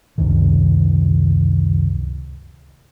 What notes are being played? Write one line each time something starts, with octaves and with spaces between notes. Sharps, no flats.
C#2 F#2 C3 D#3